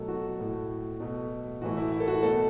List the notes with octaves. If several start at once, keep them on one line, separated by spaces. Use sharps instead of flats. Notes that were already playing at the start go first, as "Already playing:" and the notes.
Already playing: B2 F#3 A3 A4
F#4
A2 A3
B2 A3
A2 E3 A3 F#4
E4
E4
A4
F#4
B2 A3 A4